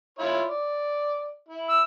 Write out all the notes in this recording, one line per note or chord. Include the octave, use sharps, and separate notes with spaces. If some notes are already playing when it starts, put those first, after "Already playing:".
E4 F4 C#5
D5
E4
E6